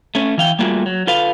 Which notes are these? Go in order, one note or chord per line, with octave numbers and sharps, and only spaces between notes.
A3 C#4
E3 F5 G5
G3 A3 A#3 F4 F#4 G#4
F#3
F4 A4 B4 F5